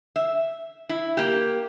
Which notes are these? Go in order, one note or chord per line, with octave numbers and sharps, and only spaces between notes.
E5
E4
A#3 G4